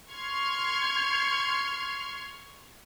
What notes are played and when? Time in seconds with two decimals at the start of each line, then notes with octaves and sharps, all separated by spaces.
0.12 C6 C#6 F6 G#6 C#7